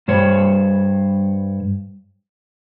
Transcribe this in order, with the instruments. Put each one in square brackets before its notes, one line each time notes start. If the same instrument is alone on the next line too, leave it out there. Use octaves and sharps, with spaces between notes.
[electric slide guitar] G2 G3 C5 C#5